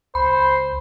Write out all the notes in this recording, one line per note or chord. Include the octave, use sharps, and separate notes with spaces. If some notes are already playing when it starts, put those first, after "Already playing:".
C#2 C5 B5